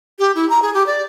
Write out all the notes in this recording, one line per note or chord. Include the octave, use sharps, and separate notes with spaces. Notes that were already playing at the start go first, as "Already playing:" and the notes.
G4
E4
A#5
G#4
G4
D5